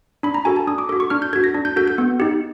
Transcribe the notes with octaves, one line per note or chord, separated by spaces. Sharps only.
D4 B5
A#5
F#4 A4 G#5
A5
D4 D#6
D6
F#4 A4 D6
C#6
D4 F6
G6
F#4 A4 G#6
A#6
D4
G6
F#4 A4 G6
G6
B3
D#4 G4